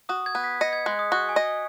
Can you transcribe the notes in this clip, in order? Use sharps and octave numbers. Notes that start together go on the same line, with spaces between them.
F#4 D#6
G#6
B3
B6
D#5 C#7
G#6
G#3 F#6
D#6
F#4 C#6
G#5
D#5